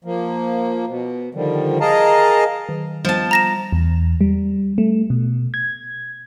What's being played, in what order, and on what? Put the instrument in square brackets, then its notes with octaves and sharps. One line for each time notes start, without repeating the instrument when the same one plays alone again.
[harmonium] F3 A#3
B2
D3 D#3 F3 G3
G#4 A#4 D#5 F5 A5 A#5
[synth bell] D#3
[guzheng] F3 A5 [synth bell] G3 B3
[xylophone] A#5 A#6 E7
[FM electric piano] E2
G3
A3
B2
G#6